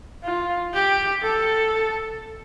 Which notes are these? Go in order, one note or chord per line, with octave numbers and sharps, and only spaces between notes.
F4
G4
A4